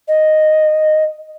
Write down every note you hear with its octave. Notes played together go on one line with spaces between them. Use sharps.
D#5